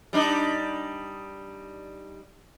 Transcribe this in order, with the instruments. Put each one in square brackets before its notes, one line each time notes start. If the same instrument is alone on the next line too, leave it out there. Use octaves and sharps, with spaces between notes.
[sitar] G3 D4 D#4